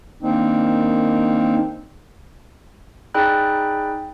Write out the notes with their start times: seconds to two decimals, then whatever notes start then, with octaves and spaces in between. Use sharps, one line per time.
0.23 D#3 A#3 C4 D4 D#4
3.14 D#4 G#4 D5 G5 B5 F#6